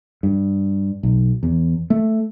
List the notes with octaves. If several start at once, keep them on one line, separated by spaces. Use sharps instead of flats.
G2
B1
E2
A3